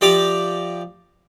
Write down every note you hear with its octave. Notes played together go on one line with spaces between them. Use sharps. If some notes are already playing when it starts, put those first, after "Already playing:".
F3 G4 D5 E5 A#5 D6